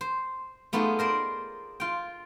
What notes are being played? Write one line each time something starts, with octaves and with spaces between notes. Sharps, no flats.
C5
A3 B3 D#4 F4 G4 G#4
A#4 C5 D5
F4 G5